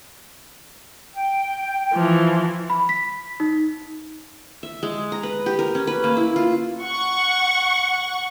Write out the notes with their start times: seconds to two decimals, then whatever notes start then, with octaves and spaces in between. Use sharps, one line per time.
1.14 G5
1.93 E3 F3
2.70 B5
2.89 B6
3.40 D#4
4.63 E5
4.83 G#3
5.12 A#5
5.23 B4
5.46 G4
5.59 A#4
5.75 C#4
5.87 B4
6.04 A#3
6.17 E4
6.36 F4
6.83 F#5 C#6